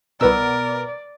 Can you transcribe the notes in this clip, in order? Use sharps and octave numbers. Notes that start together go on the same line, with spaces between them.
C2 B2 B3 A#4 B4 D5 E6